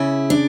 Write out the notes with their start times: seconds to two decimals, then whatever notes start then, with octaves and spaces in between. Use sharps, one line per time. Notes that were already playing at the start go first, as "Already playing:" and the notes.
Already playing: C#3 E4
0.30 D4